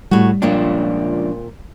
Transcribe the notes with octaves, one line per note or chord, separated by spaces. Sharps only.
A2 G3 F#4
C#2 A#2 F3 A#3 C4 D4